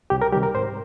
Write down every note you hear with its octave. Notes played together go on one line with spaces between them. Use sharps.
C2 G4
A#4
C3 D#3 G3 G4
A#4
G#2 C5